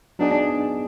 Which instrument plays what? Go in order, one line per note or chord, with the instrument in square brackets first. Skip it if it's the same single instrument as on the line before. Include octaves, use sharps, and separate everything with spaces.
[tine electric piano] F#3 B3 D#4 G#4 [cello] D4